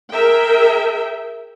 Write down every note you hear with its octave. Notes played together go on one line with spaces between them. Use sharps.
G#4 A#4 E5 G5